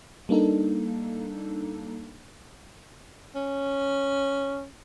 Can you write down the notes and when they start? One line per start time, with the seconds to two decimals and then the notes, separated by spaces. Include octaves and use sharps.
0.29 G3 A#3 D4 D#4 A4
3.35 C#4